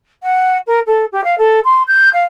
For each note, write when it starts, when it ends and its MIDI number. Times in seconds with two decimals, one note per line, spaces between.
0.23 0.57 78
0.67 0.80 70
0.86 1.05 69
1.12 1.24 67
1.24 1.35 77
1.38 1.60 69
1.64 1.83 84
1.87 2.09 91
2.13 2.24 77